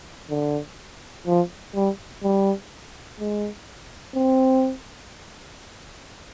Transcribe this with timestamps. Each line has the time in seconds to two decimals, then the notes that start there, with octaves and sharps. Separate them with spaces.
0.30 D3
1.27 F3
1.75 G3
2.23 G3
3.20 G#3
4.15 C4